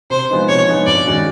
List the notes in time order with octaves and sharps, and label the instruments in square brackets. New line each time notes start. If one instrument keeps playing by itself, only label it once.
[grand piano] C3 [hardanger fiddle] C5
[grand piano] F3 G#3 B3 D#4
[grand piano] C3 [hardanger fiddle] C#5
[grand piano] F3 G#3 B3 D#4
[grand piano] G2 [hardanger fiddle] D5
[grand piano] D#3 G#3 C#4 F#4